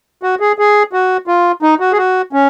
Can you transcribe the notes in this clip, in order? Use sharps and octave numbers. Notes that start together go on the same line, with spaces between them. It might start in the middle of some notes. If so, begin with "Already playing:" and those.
F#4
G#4
G#4
F#4
F4
D#4
F#4
G#4
F#4
C#4